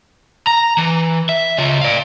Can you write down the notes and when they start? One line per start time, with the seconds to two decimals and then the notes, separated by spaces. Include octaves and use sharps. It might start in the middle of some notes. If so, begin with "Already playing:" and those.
0.47 A#5
0.78 E3
1.29 E5
1.58 C#3 F4
1.81 D5 F5